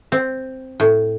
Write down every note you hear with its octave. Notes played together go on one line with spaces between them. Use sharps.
C4
A2